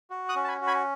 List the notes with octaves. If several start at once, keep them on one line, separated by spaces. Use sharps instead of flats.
F#4
D#6 F#6
C#4
A5
G#5 B5
F#4
G#5 B5